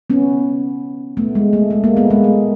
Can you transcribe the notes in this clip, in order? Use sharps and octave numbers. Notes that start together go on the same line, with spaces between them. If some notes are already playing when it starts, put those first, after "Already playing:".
B3 C#4
A3 B3
G#3
A3
A3
G#3 A#3
A3 B3
G#3 A#3
A3